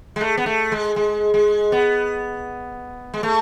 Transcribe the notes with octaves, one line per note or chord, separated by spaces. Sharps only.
G#3
A3
B3
A3
G#3
G#3
G#3
B3
G#3
A3